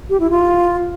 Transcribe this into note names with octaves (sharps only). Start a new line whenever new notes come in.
G4
E4
F4